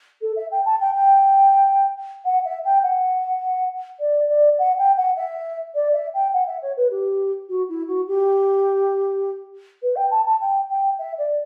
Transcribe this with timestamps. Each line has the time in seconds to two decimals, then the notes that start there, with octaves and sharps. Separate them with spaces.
0.21 A4
0.36 E5
0.51 G5
0.65 A5
0.80 G5
0.94 G5
2.25 F#5
2.45 E5
2.64 G5
2.82 F#5
3.99 D5
4.28 D5
4.58 F#5
4.78 G5
4.96 F#5
5.16 E5
5.74 D5
5.93 E5
6.13 G5
6.33 F#5
6.47 E5
6.61 C#5
6.76 B4
6.90 G4
7.49 F#4
7.68 E4
7.87 F#4
8.07 G4
9.82 B4
9.95 G5
10.11 A5
10.25 A5
10.40 G5
10.69 G5
10.98 E5
11.18 D5